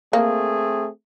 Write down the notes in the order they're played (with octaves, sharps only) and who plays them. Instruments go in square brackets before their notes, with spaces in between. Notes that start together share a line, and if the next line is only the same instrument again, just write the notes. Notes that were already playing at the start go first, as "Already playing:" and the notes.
[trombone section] A3 C4 G#4 [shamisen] A#3